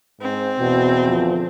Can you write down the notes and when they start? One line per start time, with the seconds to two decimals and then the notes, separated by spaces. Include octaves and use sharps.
0.21 G#2 C4
0.59 E2 B2
1.07 D3 F3